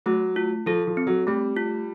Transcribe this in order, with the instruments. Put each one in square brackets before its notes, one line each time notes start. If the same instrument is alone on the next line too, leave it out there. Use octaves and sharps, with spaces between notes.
[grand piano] F#3 [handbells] A3
[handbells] F4
[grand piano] F3 [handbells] A4
[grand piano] F3
[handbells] C4
[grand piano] F#3
[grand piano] G3 [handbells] A3
[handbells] F4